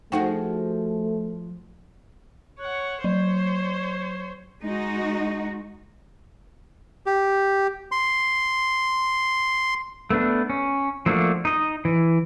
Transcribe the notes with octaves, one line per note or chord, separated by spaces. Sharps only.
F3 A3 D#4 F#4 G#4 F#5 G5
C#5 F#5
F#3 C5 C#5
G#3 D#4 F#4
G4
C6
A3 B3 D4
C#4
F3 A3 A#3 D4 F#4
D#4 D#5
E3